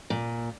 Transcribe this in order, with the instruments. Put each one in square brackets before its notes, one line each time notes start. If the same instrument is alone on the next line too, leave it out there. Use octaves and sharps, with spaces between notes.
[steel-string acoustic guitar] A#2